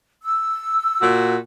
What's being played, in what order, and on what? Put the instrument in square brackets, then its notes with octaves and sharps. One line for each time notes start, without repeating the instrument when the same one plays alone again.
[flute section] E6
[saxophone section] A#2 F#4